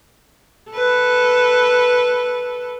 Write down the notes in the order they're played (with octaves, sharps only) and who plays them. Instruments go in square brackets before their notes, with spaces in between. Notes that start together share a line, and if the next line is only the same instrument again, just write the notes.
[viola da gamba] A4 B4